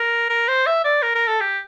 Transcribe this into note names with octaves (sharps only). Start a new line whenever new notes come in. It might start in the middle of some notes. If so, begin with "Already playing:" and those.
Already playing: A#4
A#4
C5
E5
D5
A#4
A#4
A4
G4